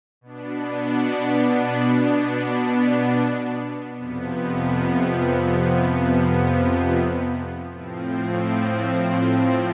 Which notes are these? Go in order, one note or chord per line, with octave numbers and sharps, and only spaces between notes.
B2 B3 D4
F2 C3 F3 B3
A2 F3 C4